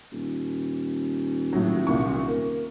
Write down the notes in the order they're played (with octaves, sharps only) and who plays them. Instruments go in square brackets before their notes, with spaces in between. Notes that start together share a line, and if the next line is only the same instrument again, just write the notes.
[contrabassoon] D#1
[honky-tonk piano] A2 F#3
C2 A#2 C#6
A#3